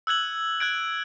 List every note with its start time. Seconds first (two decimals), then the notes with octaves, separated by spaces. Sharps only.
0.07 E6 F#6 G#6 F#7
0.60 F#6 G#6 D7